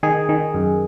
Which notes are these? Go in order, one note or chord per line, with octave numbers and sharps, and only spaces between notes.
D#3 G#4
D#3
F#2